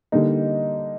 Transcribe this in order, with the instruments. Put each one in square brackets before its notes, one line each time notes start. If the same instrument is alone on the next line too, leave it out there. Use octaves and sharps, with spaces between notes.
[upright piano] D3 G3 A#3 D#4